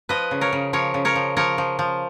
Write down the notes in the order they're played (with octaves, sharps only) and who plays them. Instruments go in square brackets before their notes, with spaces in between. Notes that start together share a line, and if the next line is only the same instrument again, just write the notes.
[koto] F3 B4 D#5
C#3
A#4 C#5
C#3
F3 A#4 C#5
C#3
A#4 C#5
F3
F3 A#4 C#5
F3
F3